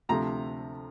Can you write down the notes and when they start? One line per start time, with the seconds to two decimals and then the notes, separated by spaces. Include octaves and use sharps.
0.09 D2 C3 F3 A3 A#5